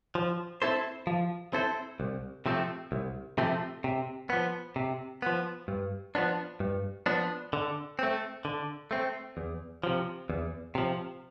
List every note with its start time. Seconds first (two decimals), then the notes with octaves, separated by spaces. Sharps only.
0.15 F3
0.62 C4 E4 A4 C5
1.07 F3
1.53 C4 E4 A4 C5
2.00 C2
2.46 C3 F3 A3 C4
2.92 C2
3.38 C3 F3 A3 C4
3.84 C3
4.30 F3 B3
4.76 C3
5.22 F3 B3
5.68 G2
6.15 F3 B3 D4
6.60 G2
7.06 F3 B3 D4
7.53 D3
7.99 A3 C4
8.45 D3
8.91 A3 C4
9.37 E2
9.84 C3 F3
10.30 E2
10.75 C3 F3